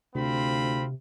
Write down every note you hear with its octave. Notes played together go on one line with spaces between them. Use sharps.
D2 C3 C4 F4 B5